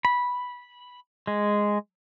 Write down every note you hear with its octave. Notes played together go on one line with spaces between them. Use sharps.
B5
G#3